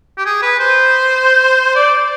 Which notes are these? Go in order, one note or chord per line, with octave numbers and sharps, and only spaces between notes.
G4
G#4
B4
C5
D5